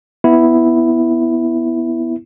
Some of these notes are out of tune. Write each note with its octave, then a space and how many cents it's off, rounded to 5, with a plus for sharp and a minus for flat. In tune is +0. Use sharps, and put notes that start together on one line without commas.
B3 +0 E4 +0